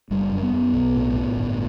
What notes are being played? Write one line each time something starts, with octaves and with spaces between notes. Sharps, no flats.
F#1 G3
F#2
B3
F#2
B1
A2
A2
G1